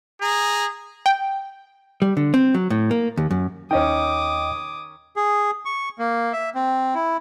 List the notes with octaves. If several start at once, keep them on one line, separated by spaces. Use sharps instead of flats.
G#4 A#5
G5
G3
D3
C4
F#3
A2
A#3
D#2
F#2
D#2 D#3 C#4 D#5 G5 D6 D#6
G#4
C#6
A#3
E5
C4
E4